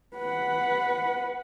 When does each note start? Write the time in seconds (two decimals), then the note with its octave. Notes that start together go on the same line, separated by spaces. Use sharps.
0.16 B4 F#5